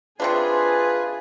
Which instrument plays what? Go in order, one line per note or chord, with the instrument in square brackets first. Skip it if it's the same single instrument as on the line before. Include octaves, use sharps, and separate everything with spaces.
[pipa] C3 C4 D4 [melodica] F4 [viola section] G#4 G#5 [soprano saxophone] B4